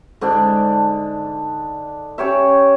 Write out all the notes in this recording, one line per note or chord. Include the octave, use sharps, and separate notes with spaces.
G#2 D3 D4
C#4 G4 C#5 E5